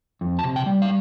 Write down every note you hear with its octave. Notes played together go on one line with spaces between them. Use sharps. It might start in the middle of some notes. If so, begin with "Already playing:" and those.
F2
A5
C3
G5
G3
F5